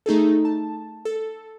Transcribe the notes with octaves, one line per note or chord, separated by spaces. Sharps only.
A3 D#4 G#4 A4
A5
A4